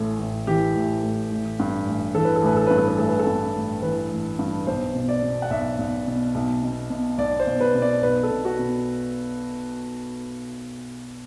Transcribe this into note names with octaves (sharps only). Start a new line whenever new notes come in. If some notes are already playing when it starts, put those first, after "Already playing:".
Already playing: A1 A2 A4
A1
E3 G4
A1
A2
A1
G2
A1
E3 A4
B4
A4
A1 B4
A4
G2 B4
A4
B4
A1 A4
B4
A4
G2
A1
E3 B4
A1
G2
B1 C5
B2
D5
B2
F#5
B1 E5
B1
B2
B1
B2
B2
B1 D5
C5
B1
B4
B2
D5
B1 B4
A4
B2
F#4
B2